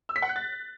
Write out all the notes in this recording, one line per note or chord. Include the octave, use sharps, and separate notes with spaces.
E6
B6
F#5
F#6
A6